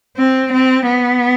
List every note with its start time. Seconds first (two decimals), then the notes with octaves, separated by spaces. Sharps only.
0.17 C4
0.53 C4
0.89 B3